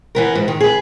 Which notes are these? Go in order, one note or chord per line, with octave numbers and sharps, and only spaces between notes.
E3 B3 A#4
G#2
D#3
G#4 B4